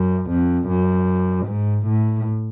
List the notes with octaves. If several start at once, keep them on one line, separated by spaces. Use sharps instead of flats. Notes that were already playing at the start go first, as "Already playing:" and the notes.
Already playing: F#2
F2
F#2
G#2
A2